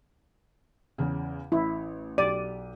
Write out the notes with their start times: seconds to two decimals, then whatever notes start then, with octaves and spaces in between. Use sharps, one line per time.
0.98 E2 C#3
1.52 A1 E4
2.18 B1 G4 D5 D#7